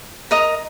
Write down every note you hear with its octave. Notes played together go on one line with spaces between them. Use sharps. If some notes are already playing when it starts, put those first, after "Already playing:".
A#4 D#5 A#5 D#6